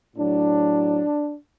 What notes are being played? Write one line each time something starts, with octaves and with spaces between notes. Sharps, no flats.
A2 F#3 D4